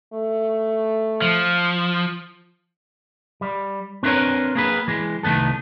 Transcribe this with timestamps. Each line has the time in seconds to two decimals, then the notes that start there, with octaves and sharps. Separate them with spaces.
0.14 A3
1.22 F3
3.41 G3
4.03 C4 D4 E4 A#4 B4 C#5
4.55 A#3 G#4 B4
4.88 E3 G#3
5.23 C2 D#3 A3 B3 A4